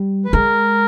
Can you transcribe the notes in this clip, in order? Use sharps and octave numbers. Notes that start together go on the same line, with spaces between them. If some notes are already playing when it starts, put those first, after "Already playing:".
Already playing: G3
B4
G#3 A#4